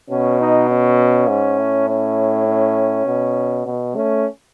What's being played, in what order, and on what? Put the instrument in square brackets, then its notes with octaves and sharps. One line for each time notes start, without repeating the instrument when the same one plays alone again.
[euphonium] B2 [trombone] C#4
[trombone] D#4
C#4
[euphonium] G#2
A2
[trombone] C#4
C#4
[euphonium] B2
B2
[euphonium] A3 [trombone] C#4